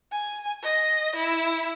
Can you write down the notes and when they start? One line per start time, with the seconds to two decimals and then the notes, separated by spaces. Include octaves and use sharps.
0.12 G#5
0.63 D#5
1.16 E4